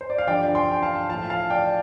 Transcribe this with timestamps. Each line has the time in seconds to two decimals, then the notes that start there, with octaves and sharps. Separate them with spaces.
0.01 C5
0.10 D5
0.18 F5
0.27 G2 D3 F3 D5 G5
0.55 G5 C6
0.71 G5
0.83 F5 A5
1.09 A2 F3 F5 A5
1.30 F5 A5
1.50 D5 G5
1.61 F5